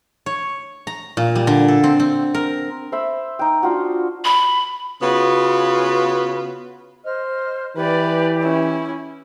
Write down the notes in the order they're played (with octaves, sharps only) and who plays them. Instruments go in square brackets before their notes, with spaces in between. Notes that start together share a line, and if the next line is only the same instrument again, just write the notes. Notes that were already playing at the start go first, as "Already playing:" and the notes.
[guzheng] C#5
A#5
A#2
G3
D3
A4
C4
C4
A#4
[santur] C5 E5 B5
D#4 G5
D4 F4 F#4
[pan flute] B5
[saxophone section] C#3 B3 F4 F#4 B4
[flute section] C5 D#5 F6
[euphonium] E3 [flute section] G4 [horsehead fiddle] B4 D5
[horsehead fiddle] C#4 E4